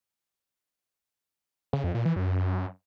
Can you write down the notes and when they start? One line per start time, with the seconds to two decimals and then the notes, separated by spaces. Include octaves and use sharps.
1.73 C#3
1.84 F2
1.95 A#2
2.05 E3
2.16 F#2